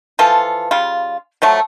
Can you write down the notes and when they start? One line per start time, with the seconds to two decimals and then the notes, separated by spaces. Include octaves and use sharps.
0.19 E3 F3 F4 A4
0.71 C#3 G3 F4
1.42 F3 F#3 A3